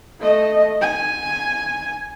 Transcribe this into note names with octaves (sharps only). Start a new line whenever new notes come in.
A3 D#5
G#5